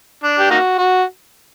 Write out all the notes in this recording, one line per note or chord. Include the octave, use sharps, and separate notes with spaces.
D4
G4
A#3 D#4 F#4
F#4